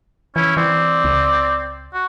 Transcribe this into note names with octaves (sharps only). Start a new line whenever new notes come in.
E3 C#4 E4
E3 C4 D5
C#2
F#4